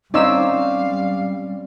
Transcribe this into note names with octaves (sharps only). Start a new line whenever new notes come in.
G3 C4 C#4 D#4 D5 F5 E6